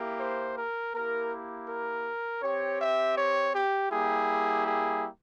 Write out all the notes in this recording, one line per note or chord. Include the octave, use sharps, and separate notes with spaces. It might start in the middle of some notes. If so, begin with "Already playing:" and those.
Already playing: A#3 E4 G4
C5
A#4
A#3 E4 G4 A#4
A#4
C4 G4 C#5
E5
C#5
G4
G3 A#3 E4 G4 G#4
G#4